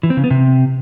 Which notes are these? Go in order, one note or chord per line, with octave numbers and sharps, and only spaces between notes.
E3
C4
C#3
B3
C3